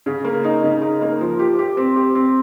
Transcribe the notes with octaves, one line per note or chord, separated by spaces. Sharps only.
C#3
A#3
D#4
C#3
D#4
A#3
F3
G4
G4
C4
G4
C4